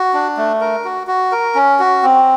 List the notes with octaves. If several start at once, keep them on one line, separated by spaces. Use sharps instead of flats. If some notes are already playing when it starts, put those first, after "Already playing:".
Already playing: F#4
D4
A3
A#4
F#4
F#4
A#4
C#4
F#4
C4